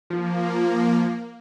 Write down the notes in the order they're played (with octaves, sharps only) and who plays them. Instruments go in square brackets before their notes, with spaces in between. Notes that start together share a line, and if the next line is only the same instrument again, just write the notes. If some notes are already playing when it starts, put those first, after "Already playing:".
[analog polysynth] F3 [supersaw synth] A#3